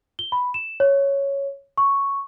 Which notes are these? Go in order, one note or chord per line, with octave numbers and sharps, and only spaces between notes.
G7
B5
E7
C#5
C#6